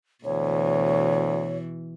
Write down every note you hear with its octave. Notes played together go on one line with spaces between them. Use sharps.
D2 B2 E3 C#5